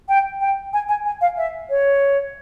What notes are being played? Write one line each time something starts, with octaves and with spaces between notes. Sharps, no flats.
G5
G5
G#5
G#5
G#5
F5
E5
C#5